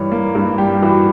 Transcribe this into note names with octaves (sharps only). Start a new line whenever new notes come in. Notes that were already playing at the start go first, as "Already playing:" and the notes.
Already playing: G2 E3 G3 C#5
A#3
G2
G3 G4
E3 F#4